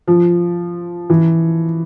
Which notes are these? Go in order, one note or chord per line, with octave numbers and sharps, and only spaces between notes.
F3
E3